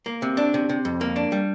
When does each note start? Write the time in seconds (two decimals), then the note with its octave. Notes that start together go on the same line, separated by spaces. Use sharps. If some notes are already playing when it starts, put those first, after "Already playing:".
0.06 A#3
0.22 C3
0.37 D4
0.54 C3
0.69 C3
0.85 F2
1.01 A#3
1.16 D4
1.32 G3